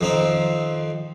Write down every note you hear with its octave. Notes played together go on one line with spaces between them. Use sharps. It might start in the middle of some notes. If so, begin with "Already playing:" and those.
F2 D#3 C4